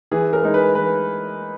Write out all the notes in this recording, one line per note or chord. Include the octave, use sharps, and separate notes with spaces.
E3 G#4
A#4
G#3 D#4
B4
E3 B4